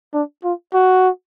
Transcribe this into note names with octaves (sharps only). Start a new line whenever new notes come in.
D4
F4
F#4